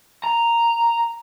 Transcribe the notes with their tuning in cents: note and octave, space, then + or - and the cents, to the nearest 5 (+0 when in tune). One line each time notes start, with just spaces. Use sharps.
A#5 -5